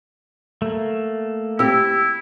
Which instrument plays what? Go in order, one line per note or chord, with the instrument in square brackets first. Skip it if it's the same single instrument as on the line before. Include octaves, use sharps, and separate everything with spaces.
[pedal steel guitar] A3 A#3
[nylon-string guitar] C4 G4 [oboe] E4 [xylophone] E6